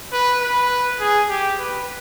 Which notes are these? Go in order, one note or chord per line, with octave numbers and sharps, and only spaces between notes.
B4
B4
G#4
G4
B4